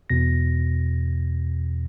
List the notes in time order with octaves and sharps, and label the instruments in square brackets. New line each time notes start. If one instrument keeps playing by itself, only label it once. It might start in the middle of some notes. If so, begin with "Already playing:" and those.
[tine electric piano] E2 B2 A#6